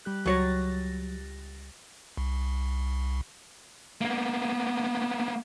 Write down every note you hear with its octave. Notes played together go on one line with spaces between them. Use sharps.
G3 G4 F#6
C#2 F#3 C#5 A6 A#6
C2
A#3 B3